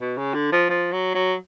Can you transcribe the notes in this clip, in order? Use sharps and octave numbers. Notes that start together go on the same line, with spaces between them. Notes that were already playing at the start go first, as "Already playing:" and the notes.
B2
C#3
D3
F3
F3
F#3
F#3